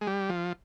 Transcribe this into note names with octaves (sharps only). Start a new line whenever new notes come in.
G#3
G3
F3